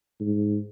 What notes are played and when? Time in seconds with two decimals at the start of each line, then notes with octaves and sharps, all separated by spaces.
0.20 G#2